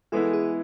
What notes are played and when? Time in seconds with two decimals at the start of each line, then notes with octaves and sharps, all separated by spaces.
0.12 E3 G#3 B3 E4 A4
0.33 G#4